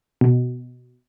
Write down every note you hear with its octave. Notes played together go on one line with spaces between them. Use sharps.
B2